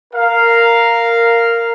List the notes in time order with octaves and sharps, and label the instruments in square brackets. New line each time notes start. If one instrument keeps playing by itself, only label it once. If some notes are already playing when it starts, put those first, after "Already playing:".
[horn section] A#4 F5